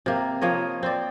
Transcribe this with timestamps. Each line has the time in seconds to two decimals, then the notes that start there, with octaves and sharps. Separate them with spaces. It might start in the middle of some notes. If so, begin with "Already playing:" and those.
0.06 C3 A#3
0.41 F3 A#3 C#5 D#5
0.83 C4 D5